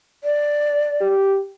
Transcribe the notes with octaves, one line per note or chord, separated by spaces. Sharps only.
D5
G4